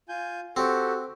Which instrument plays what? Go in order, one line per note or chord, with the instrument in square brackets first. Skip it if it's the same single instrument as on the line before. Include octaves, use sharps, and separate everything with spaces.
[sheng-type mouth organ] F4 G#5 G6
[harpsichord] C4 [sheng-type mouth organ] F#4 G4 A4